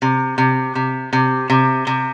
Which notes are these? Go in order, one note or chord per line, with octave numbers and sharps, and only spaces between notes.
C3
C3
C3
C3
C3
C3